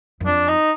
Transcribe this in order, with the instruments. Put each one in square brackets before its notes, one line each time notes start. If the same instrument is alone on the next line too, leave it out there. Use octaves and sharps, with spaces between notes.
[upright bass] F#2
[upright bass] F2 [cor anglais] D4
[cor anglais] D#4